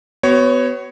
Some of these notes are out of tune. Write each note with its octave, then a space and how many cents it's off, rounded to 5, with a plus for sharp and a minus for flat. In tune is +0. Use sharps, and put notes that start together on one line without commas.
B3 +25 F#4 +30 C#5 +0